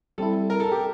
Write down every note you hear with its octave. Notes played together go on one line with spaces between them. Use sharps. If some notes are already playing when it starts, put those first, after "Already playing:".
G3 C4 E4 A4
A#4
A4
G4